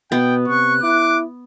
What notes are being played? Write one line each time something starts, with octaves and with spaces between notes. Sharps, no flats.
B2 B3 G5
C3 C#6 F#6
E4 D6